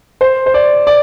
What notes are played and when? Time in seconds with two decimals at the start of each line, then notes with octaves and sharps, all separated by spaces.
0.21 C5
0.46 C5
0.54 D5
0.87 D5